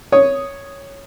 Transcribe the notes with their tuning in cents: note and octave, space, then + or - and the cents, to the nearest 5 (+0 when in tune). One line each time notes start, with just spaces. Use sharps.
C#5 +0 D#6 +0